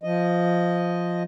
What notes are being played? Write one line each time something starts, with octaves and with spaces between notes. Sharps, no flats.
F3 D#5